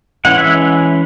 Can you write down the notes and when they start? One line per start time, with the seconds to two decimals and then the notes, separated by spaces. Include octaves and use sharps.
0.25 E3 G#3 C#4 F#5
0.38 E5